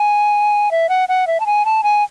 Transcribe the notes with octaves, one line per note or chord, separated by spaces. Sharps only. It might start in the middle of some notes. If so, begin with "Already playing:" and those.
Already playing: G#5
E5
F#5
F#5
E5
A5
G#5
A5
G#5